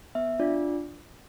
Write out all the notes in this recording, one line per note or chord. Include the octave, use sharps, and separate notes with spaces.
B3 E5
D4 F4 D5